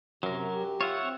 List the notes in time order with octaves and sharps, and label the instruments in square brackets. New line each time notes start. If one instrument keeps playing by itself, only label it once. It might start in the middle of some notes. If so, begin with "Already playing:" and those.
[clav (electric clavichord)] F#2 [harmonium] C3 [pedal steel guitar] F#3 A#4
[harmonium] G4
[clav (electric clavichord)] F4 [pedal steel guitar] C#5 E5 F#5
[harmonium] C4